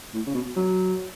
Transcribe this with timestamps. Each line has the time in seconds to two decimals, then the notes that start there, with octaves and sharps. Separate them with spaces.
0.14 A2
0.27 C#3
0.35 B2
0.56 F#3